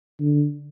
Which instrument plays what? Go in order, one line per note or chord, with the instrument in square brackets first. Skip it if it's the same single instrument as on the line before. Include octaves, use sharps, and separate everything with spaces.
[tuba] D3